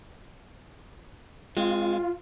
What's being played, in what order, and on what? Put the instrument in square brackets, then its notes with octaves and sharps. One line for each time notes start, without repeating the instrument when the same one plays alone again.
[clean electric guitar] G#3 C4 [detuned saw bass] F4